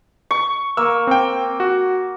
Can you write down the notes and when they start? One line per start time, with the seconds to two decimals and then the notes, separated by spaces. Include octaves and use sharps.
0.31 C#6
0.77 A#3 E6
1.07 C4 G5
1.60 F#4